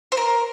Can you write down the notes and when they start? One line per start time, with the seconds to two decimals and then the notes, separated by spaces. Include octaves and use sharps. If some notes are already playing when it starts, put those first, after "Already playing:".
0.12 C5
0.17 A#4